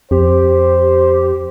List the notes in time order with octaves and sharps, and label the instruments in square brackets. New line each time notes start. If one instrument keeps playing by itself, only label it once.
[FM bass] F2 [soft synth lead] G4 [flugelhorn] C5